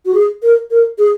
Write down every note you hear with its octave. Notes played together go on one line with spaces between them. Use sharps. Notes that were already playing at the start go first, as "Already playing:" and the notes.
F#4
G#4
A#4
A#4
G#4